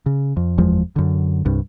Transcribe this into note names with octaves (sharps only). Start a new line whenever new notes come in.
C#3
F2
F#1 E2 F3 G#3
F#2 D3
C2 G2